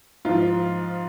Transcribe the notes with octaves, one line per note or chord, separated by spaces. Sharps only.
G#2 F3 F4